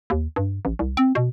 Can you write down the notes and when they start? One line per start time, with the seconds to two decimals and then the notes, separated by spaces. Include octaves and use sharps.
0.10 D#2
0.36 G2
0.65 A1
0.79 C2
0.97 C4
1.15 B2